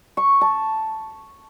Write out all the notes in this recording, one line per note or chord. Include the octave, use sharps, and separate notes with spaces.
C#6
A5